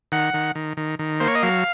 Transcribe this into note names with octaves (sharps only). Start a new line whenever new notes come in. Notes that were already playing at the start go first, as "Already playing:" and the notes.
D#3 F#5
D#3
D#3
D#3
D#3
A#3 C5
C#5
D#5
F#3 F5